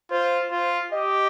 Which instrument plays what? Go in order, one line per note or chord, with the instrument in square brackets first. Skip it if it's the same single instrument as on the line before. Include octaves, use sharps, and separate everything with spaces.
[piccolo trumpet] F4 [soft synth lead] C5
[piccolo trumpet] F4
[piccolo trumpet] G4 [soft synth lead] D#5